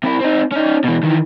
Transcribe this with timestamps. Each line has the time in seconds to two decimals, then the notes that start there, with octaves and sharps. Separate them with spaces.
0.04 C3 E4
0.20 C4 D#4
0.52 C#4 D#4
0.84 B2 E3
1.03 D#3 E3